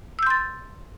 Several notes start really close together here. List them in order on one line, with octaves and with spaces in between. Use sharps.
E6 G6 C6 A6